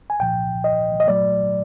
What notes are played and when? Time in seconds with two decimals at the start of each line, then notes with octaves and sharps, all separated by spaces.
0.10 G#5
0.20 C2 A#2 F3 G5
0.64 D#5
1.00 D#5
1.07 A#2 F#3 A3 D5